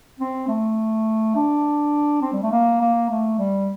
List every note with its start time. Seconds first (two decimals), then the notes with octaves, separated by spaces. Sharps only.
0.19 C4
0.48 A3
1.35 D4
2.22 C4
2.33 G3
2.43 A3
2.52 A#3
2.81 A#3
3.10 A3
3.39 G3